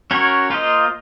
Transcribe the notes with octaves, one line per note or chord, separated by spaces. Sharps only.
C#4 F#4 A#4 C#5
A#3 F4 C5 D#5